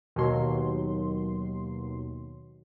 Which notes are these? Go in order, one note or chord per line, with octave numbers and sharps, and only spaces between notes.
D#2 B2 F#3 C6